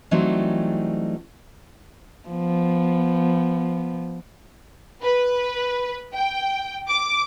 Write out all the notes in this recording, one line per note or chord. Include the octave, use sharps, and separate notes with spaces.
E3 F#3 G3 A3 C4 D#4
F3 B3
B4
G5
D6